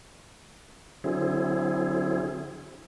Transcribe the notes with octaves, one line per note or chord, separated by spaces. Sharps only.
D3 F#3 C4 E4 G#4